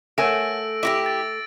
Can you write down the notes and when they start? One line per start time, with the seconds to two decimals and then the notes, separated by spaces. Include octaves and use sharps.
0.18 A3 A#4 C#5 F#5 G#5 E6 A#6 D7
0.83 E4 F#4 G4 D6 A#6 D7
1.06 A6